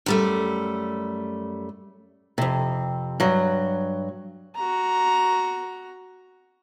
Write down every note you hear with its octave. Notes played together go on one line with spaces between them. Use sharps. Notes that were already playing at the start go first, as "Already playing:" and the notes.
F#2 G3 A3
F2 C3
G2 F#3
F#4 A#5